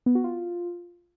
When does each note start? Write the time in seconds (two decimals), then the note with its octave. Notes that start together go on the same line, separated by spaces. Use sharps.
0.06 B3
0.15 F#4
0.24 F4